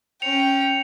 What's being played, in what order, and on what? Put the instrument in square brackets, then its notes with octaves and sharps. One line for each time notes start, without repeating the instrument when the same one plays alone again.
[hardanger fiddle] C#4 G5 [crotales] C#7 F7